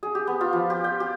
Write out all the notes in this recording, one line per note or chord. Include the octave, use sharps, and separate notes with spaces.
G#4
G4
B3
F4
F3
G4
G5
G4